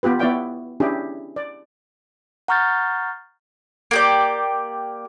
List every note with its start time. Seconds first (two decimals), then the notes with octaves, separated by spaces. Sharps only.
0.03 B3 F4 G4 B4
0.19 B3 E4 C#5 D5 F5 G5
0.80 C#4 D4 E4 G4 G#4
1.36 D5
2.48 F#5 A#5 C#6 F6 G6 A6
3.91 A#3 G4 D5